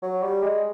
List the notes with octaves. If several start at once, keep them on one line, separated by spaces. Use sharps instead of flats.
F#3
G3
G#3